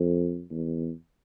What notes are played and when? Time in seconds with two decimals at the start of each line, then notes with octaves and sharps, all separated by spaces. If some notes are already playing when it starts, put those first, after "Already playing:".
Already playing: F2
0.51 E2